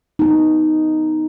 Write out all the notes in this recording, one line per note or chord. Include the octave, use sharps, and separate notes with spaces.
B3 D#4